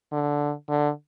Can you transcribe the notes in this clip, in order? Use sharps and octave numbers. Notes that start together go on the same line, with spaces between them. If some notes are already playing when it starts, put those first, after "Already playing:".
D3
D3